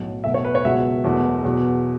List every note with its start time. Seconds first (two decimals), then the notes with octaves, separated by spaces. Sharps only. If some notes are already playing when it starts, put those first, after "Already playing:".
Already playing: B1 A2 F#3
0.24 B1 B2 A3 E5
0.34 C#5
0.45 B4
0.55 C#5
0.64 C#2 B2 F#3 B3 E5
1.04 E1 E2 B2 F#3 A3
1.44 E2 B2 F#3